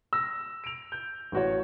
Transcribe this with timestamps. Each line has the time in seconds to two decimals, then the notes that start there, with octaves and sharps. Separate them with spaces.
0.13 E6 A#6
0.64 D7 F7
0.92 G6
1.32 A1 F#4 C#5